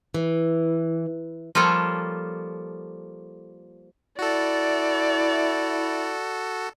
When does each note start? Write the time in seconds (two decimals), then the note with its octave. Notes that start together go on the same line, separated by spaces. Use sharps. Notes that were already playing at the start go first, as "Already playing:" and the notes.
0.14 E3
1.55 F3 G3 A#3 F4 A4 C#5
4.19 E4 F#4 A4 D5